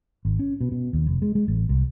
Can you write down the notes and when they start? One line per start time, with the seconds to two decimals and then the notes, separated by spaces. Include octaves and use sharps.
0.25 G#1
0.39 C#4
0.61 B2
0.72 B2
0.93 D#2
1.07 F1
1.22 G#3
1.35 G#3
1.48 A1
1.69 C2